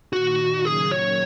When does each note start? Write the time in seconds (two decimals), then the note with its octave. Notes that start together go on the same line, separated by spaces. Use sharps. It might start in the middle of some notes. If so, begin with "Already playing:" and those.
0.13 A#2 D#3 F#4
0.65 C#3 F#3 G#4
0.92 C#5